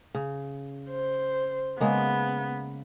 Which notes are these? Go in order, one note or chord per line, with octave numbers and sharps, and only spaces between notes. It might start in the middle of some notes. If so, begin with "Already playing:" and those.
C#3
C5
C#3 G#3 A#3 B3